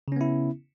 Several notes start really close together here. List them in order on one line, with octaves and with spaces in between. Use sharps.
C#3 C#4 B3 E4